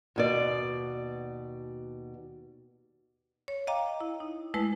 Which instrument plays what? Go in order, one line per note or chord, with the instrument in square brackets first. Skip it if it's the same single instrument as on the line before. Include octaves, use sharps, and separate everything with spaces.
[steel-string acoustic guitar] D#2 B2 D5
[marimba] C#5
D#5 F5 G5 A#5 D6
E4
D#4
G#3 A3 E4 B4